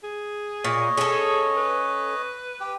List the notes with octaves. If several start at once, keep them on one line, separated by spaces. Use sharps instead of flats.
G#4
A#2 C#5 D#5
C#4 G#4 A4
B4
G4